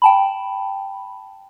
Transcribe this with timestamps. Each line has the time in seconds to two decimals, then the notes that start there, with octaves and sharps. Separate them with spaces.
0.02 G5 A5 B5